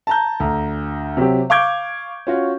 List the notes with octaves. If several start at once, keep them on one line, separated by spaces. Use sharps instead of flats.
A5 A#5 G6
D2 A#5
C3 F#3 C4 G4
F5 C#6 D6 G6 G#6 D7
C#4 F4 F#4